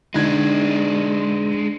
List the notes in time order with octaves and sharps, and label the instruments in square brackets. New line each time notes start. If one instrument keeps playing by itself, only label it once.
[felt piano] D3 D#4 G#6 [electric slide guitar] G#3 D4